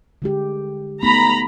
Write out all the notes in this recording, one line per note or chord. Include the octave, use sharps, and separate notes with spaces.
D3 G#3 G4
A3 B3 D#4 A#5 B5